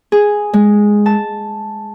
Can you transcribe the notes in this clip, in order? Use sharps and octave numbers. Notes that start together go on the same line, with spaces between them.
G#4
G#3
A5